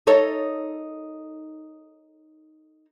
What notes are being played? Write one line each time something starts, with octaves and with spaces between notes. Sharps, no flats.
D#4 A4 C#5